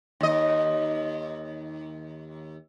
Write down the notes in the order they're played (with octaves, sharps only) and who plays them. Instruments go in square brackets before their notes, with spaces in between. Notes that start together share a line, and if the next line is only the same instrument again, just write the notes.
[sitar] D#2 D#5